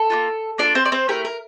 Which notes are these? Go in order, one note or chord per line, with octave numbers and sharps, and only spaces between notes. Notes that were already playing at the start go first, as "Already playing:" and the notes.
Already playing: A4
A#3 D4 F4
A#3 D4 F4 A4 D5
C4 C5
D5
C4 C5
A3 E4 G4 A#4
A#4